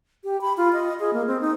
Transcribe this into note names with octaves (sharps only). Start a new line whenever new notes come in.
G4
B5
F4
D#5
G#4
A#3
C4
D#4